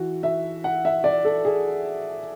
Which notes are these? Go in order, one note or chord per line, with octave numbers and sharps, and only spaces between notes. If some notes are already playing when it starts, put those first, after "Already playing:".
Already playing: E3 F#4
E5
F#5
E5
D5
A4
G#4